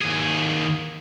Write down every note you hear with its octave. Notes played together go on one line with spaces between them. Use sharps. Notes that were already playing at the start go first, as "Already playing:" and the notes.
D#2 G#4